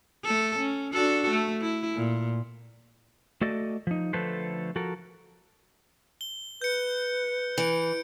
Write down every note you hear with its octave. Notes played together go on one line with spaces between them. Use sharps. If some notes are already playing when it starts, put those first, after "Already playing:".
A3 A4
C#4
D4 F#4 A4
A3
E4
A#2
A3 F#4 A4 D5 D#5
F3 D#4
D3 F3 A3 A4 B4 C5
F3 F#4 A4 A#4
G7
B4 G6 C#7
E3 C#7 D7